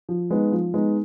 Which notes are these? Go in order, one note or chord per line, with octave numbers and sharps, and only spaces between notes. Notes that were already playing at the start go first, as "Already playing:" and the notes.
F3
G#3 B3 D#4
F3
G#3 B3 D#4